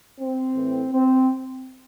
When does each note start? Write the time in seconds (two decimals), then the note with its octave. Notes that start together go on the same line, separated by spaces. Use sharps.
0.20 C4
0.56 A2 E3
0.92 C4